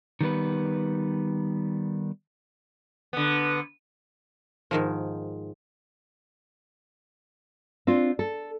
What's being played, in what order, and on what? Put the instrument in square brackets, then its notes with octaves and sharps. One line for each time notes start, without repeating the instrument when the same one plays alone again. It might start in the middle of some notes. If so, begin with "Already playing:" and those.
[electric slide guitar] D#3 G3 B3 B4
[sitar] D3 B3
[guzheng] G#2 D#3 F3
[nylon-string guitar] C4 D4 F4
A4